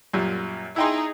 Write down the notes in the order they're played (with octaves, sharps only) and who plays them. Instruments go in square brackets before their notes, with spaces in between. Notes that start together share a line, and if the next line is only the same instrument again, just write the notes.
[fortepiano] F#2 A#2 G3
[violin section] D#4 G#4 [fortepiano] E4 G5 C6